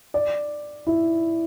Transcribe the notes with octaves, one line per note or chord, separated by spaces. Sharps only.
D5
E4